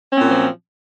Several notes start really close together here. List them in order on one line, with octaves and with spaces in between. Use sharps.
C#4 C4 A#2 F#3 F3